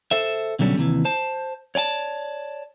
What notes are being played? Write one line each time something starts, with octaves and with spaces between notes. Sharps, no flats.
A4 C5 E5
B2 D3 F#3 G3 C#4
D#2 C3 E3
C5 A5
C#5 D5 G#5 A5